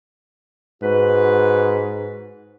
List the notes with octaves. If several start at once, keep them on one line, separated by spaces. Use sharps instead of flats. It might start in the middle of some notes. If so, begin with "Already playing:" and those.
G#2 F#4 B4